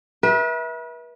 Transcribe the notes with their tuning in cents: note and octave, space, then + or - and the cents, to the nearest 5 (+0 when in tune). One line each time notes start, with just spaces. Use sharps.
B4 -40 E5 -20